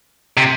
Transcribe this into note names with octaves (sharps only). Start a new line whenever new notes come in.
C3